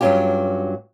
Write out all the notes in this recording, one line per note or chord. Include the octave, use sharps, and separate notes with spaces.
G2 F#3 G3 C#4 F4 G4